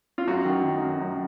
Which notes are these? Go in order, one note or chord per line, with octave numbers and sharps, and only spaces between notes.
F4
F#2 F#4
D#3
D#3
F#2
F#2